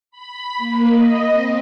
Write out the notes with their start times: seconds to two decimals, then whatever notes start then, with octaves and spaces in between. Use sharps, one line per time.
0.11 B5
0.57 A#3
0.89 D#5
1.31 C4